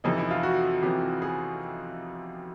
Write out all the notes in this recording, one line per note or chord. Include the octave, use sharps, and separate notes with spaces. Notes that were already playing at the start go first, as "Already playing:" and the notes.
F2 C3 E3 D#4
E4
F4
F#4
F2 C3 E3 G4
G#4